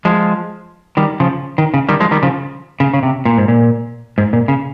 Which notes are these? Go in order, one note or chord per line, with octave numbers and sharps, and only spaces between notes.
F3 G#3
D#3 G3
C#3 F3
D#3
C#3
D#3 G3
F3 G#3
D#3 G3
C#3 F3
C#3
C#3
C3
A#2
G#2
A#2
G#2
A#2
C#3